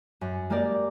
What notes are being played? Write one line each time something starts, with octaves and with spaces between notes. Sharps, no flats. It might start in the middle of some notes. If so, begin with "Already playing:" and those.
F#2
G#3 A#3 G4 A#4 D5